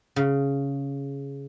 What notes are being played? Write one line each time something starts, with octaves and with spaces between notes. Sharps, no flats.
C#3